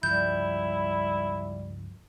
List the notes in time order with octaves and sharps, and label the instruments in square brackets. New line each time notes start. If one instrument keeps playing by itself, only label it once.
[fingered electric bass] C#2 G2 F3 [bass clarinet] G3 [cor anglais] E4 [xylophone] G6